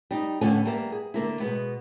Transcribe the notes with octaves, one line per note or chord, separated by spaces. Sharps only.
G3 D#4
A2 D3 A3 B3 C#4 G#5
G3 A#3 B3 E5
G#4
D3 A#3 E4
B2 F3 G#3 B3